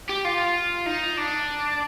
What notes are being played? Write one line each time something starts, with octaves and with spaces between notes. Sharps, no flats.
G4
F4
D#4
D4